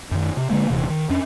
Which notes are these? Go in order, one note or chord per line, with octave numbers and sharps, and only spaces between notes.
F#2 D#3
C3
D3 G#3 A#3
D#1 C3 E3
D#3
F2 C#4 D4